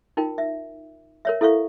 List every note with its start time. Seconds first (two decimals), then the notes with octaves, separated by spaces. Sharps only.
0.17 D#4 F4 A#4 G5
0.38 E5
1.25 A#4 C#5 E5
1.41 E4 A4 E5 F5 C#6